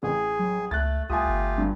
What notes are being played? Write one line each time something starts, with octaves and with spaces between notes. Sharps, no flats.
A1 G#4
F#3
C#2 A3 F#6 A6
C2 A3 F4 G4 G#5 D#6
G1
G2